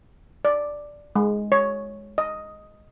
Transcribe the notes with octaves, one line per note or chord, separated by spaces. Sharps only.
D5
G#3
C#5
D#5